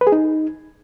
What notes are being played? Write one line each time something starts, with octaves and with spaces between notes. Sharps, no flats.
B4
G#4
D#4